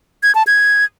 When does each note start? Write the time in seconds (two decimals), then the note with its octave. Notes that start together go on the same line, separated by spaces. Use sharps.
0.23 G#6
0.35 A5
0.47 G#6